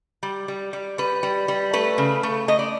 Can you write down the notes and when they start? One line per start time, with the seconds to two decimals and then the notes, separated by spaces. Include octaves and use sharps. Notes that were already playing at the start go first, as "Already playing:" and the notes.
0.23 G3
0.48 G3
0.73 G3
0.98 G3 B4
1.23 G3
1.48 G3
1.73 A3 B4
1.98 C#3
2.23 A3
2.48 A3 D#5
2.59 D5